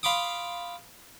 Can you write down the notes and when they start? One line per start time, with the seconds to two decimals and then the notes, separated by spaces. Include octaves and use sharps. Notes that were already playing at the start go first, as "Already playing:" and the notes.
0.03 F5 B5 C6 D6 D#6